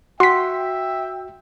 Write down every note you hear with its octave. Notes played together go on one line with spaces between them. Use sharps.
F#4 E5 G5 C6 B6